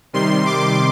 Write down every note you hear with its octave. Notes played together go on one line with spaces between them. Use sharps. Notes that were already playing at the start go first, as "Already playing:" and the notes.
C3 D#3 G3 C6
D6